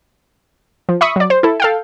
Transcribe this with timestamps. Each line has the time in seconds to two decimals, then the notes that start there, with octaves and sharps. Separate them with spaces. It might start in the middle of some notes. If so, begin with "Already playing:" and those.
0.89 F3
1.01 E5 B5 C#6 D#6
1.16 F#3 D5
1.30 C5
1.43 E4 A4
1.60 A4 F5 G5